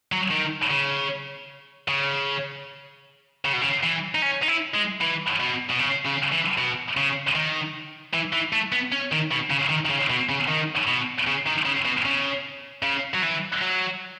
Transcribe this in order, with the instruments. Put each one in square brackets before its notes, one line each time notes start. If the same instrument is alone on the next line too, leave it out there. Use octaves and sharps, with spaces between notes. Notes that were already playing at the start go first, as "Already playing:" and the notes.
[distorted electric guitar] F#3
D#3
C#3
C#3
C#3
B2
C#3
E3
D#4
C#4
D#4
E4
G#3
E3
B2
B2
C#3
C#3
E3
B2
C#3
D#3
E3
E3
A3
B3
C#4
D#3
B2
C#3
D#3
D#3
C#3
B2
C#3
D#3
B2
C#3
D#3
C#3
B2
C#3
C#3
F#3
E3
F#3